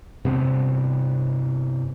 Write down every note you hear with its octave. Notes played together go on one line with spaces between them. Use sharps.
G2 C3 B3 C4